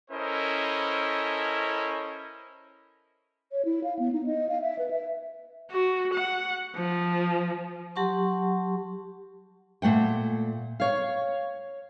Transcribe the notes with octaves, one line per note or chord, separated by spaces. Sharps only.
C#4 E4 A4 A#4 C5 D#5
C#5
E4
F5
B3
D#4
D#5
F5
E5
B4
E5
F#4
F#5
F3
F#3 G4 F#5 A5 C6 C#6
A#2 A3 F#5 G5
C#5 F5